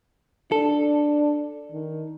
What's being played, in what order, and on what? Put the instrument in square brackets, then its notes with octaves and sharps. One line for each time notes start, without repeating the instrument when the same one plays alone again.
[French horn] D4 [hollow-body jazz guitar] A4
[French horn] D#3